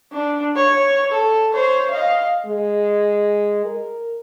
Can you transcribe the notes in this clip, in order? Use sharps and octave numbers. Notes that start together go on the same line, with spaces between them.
D4
C#5
A4
C5 C#5
D#5 F5
G#3
A#4